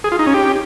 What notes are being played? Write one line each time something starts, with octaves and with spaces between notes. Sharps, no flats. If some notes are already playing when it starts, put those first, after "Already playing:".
G#4
F4
D#4
C#4
G4